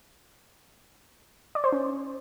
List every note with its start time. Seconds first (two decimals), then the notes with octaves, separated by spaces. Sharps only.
1.55 D5
1.64 C5
1.72 C#4